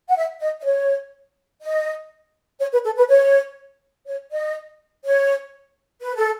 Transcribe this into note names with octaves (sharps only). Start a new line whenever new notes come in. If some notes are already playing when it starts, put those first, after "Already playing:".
F#5
E5
D#5
D#5
C#5
D#5
C#5
B4
A4
B4
C#5
C#5
D#5
C#5
B4
A4